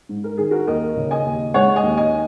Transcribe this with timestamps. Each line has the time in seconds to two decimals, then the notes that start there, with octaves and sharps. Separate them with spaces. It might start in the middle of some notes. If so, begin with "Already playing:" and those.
0.09 G#2
0.24 A#4
0.38 D#3 G#4
0.51 F#4 A#4
0.67 D#2 A#4 D#5
0.96 C#3
1.11 D#5 G#5
1.25 D#2
1.54 G#3 C#5 F#5
1.76 D#5 G#5
1.83 D#2
1.97 D#5 G#5